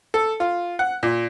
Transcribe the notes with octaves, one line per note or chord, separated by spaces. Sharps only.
A4
F4
F#5
A#2